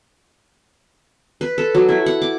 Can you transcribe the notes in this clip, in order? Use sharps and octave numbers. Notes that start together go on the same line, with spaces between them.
B4
A4
F#3
E4
F#5
D6